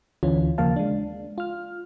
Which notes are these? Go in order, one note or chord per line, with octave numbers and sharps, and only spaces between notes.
D2 D3 E3 C#4 F4
D#2 C#3 F3 A#3 F5 A5
G#3 D4
F4 F6